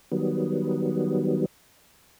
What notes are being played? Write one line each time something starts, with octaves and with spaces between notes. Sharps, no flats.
D#3 F#3 G3 B3